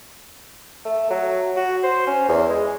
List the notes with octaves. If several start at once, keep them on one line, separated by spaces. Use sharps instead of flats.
A3
F#3
F#4
C5
C#4
E2
G#3